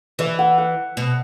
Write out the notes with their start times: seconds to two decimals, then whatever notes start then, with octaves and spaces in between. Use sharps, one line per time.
0.19 E3 E5
0.39 F#5
0.58 F#5
0.97 B2